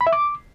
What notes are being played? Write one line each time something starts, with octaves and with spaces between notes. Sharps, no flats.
B5
E5
D6